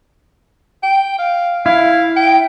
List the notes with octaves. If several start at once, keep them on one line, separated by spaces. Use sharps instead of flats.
G5
F5
E4 F5
G5